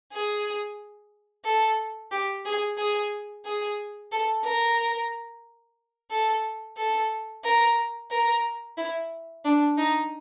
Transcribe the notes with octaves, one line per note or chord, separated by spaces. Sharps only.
G#4
A4
G4
G#4
G#4
G#4
A4
A#4
A4
A4
A#4
A#4
E4
D4
D#4